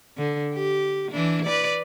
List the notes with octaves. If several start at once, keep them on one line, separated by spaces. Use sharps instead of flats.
D3
G4
E3 D4
B4 D5